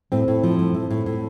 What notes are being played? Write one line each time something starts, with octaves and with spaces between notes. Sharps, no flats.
A2 C4
A2
F3
A2
A2
A2
A2